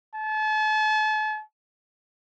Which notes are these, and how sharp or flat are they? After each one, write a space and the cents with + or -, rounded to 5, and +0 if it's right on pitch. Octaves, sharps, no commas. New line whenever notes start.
A5 -40